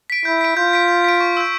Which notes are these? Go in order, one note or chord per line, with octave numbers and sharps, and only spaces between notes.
B6 D7
E4 G6
B6 D7
F4 G6
B6 D7
G6
B6 D7
C#6
E6 G6